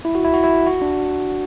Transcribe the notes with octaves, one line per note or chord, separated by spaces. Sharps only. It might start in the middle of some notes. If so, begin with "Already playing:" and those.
E4
F#4
E4
F#4
E4
F#4
D4